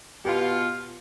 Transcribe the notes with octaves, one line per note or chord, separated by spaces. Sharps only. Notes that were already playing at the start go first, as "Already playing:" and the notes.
B2 B3 F4 G4